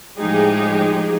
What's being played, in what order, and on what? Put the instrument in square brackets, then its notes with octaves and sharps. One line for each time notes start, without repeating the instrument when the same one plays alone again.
[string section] A2 F3 G#3 D#4 G4 G#4